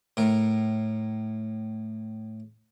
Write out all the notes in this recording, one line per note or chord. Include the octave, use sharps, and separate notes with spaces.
A2 A#4